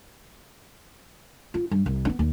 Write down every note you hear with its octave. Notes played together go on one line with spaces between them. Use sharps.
F4
G2
C2
B3 D4
D#2